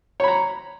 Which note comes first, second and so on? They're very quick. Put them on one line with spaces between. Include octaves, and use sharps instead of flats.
C#5 B5 A#5